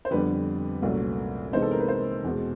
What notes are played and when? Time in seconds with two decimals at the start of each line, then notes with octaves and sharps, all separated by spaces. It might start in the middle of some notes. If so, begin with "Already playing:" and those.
0.05 C5
0.11 F2 D3 G3 B3 D4 B4
0.82 C2 A#2 F#3 A3 C#4
1.53 C3 E3 G#3 B3 D#4 C5
1.62 A4
1.71 A#4
1.80 B4
1.88 C5
2.24 E2 B2 G#3